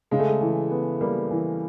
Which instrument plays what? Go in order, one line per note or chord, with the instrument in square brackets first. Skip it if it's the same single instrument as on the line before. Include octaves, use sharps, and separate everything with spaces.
[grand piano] C#3 [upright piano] G#3
[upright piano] A3
G#3
[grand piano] E3
B3
[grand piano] G3 [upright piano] A#3
[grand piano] E3